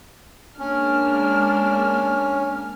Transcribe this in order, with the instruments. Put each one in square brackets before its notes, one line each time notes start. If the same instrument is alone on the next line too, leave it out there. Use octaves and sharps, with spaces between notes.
[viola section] G#3 A#3 D4 [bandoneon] C#4 [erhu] F6